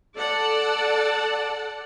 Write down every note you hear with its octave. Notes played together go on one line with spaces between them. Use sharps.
A4 D5 F#5 A5